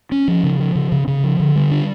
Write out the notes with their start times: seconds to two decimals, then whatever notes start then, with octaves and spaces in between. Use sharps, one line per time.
0.12 C#4
0.28 F3
0.43 C#3
0.60 F3
0.75 C#3
0.92 C#3
1.08 C#3
1.24 F3
1.40 D3
1.56 G3
1.71 D4